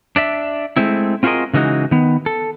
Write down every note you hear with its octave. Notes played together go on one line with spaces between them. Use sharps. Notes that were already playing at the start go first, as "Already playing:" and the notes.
D4 D5 E5
G#3 A3 C4 E4
C4 F4 F#4 G#4 A#4 D#5
C#3 E3 G#3 D#4 F#4
D#3 B3
A4